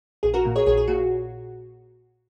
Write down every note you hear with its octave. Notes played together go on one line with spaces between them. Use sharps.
A#1 G#4
F#4 A#4
A#2
G#4 C#5
A#1 G#4 C#5
G#4
A#2 F#4